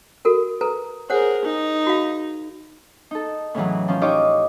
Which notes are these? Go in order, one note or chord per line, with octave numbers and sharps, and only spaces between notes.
F#4 A4 A#4
A4 B4 A#5
G#4 A#4 C5 C#5 F#5
D#4
F#4 F5
D#4 A4
A2 C#3 E3 F#3
F3 C#4
D#4 F4 G4 C#5 D#5 D6